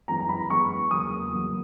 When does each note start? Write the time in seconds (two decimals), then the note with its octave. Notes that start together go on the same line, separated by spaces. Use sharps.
0.08 F#2 E3 G#3 B3 A#5
0.20 A#5
0.29 B5
0.50 F#2 E3 G#3 B3 C#6
0.91 E2 C#3 F#3 A#3 D#6
1.33 E2 C#3 F#3 A#3